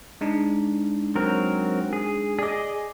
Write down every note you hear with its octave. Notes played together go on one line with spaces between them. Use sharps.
G#3 D4 D#4
F#3 C4 A#4
G#4
G#4 D5 D#5 D6